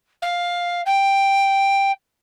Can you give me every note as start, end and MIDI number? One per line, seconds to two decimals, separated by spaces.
0.22 0.82 77
0.86 1.91 79